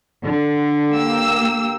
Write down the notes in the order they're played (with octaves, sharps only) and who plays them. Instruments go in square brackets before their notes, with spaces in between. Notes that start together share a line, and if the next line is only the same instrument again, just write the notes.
[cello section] D3
[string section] A#3 G4 E6